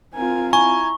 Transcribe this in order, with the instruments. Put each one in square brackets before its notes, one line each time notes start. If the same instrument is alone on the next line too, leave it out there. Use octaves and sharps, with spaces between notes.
[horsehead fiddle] C4 F4 [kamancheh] A#4 G#5
[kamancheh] E4 A#5 [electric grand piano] G#5 [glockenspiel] C#6